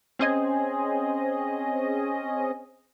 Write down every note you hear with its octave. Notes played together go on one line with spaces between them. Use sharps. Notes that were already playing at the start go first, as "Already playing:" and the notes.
C4 C#4 G#4 C5 D#5 G#5